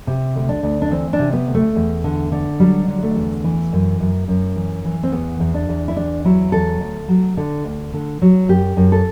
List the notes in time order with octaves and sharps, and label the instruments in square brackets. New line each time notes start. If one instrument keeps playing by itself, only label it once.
[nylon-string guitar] C3
D2
D4
D2
D4
E3 C4
D4
C3
B3
D2
A3
E2
D3
D3
F#3 G3
D3
A3
E2
E3
F#2
F#2
F#2
E3
E3
C4
E2 B3
E2
D4
E2
E4
E2 D4
F#3 E4
E2 A4
D2
F#3
D3
D2
D3
F#3
F#2 G4
F#2
A4